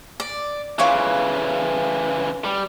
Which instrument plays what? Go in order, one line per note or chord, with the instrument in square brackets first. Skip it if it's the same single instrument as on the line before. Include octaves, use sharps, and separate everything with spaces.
[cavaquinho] D5
[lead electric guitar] C#3 E3 [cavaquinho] F4 C#5 D6
[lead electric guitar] G3